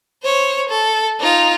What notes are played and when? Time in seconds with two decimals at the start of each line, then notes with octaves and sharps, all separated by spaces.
0.23 C5 C#5
0.69 A4
1.20 D#4 F4